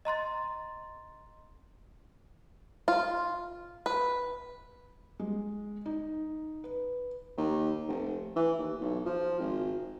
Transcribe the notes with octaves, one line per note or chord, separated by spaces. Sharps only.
D#5 A#5 C6 A6
F4
B4
G#3
D#4
B4
D#2
F1
E3
D#2
B1
F3
G#1